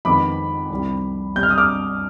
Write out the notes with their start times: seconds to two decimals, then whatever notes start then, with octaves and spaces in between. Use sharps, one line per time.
0.05 F2 D#3 G#3 B3 B5 D6
0.70 C2 C3 G3
1.35 B2 G3 C4 G6
1.43 F6
1.50 D#6
1.58 D6 F6